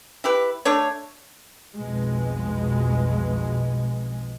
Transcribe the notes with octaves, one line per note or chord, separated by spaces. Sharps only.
E4 G4 B4
A3 D4 C#5
B1 F2 B2 G#3